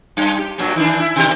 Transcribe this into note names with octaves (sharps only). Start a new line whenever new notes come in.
F#2
G4
G2 A#2 F#3
D#3 E3 D4
E4
B2 D#3 G4